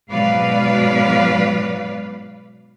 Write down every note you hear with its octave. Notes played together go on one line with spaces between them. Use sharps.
G#2 B2 F#3 B4 D5 F5